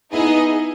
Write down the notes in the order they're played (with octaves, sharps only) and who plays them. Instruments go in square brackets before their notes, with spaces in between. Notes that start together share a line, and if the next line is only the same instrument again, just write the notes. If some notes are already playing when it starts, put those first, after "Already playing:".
[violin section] B3 D#4 G#4 D#5 [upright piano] E4